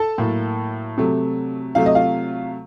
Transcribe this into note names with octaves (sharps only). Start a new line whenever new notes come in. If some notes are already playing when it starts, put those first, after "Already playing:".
Already playing: A4 A5
A2 F#3 A#3
C3 F#3 A3
C3 F#3 A3 F5
D#5
F4 F5